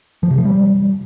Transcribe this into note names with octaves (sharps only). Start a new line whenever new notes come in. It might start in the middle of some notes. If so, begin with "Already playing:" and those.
F3
C3
F3
G3